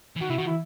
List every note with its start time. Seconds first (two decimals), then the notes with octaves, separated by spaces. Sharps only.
0.16 E3
0.21 D#3 F#4
0.30 C3 E4
0.38 D#3 F#4
0.47 E4